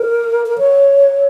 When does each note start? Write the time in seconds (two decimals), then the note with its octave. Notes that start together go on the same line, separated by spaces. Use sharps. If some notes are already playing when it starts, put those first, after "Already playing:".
Already playing: A#4
0.46 A#4
0.58 C#5